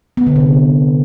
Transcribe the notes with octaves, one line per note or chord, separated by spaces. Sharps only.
B3
D3
C3